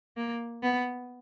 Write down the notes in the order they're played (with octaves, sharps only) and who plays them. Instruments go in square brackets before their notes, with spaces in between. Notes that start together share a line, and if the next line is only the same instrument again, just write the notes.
[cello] A#3
B3